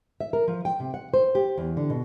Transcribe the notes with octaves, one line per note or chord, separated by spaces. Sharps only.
E5
A#4
F3
G5
C3
F#5
C5
G4
E2
D3
B2